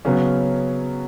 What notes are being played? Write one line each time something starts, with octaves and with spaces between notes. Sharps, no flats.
C#3 F#3 B3 C#4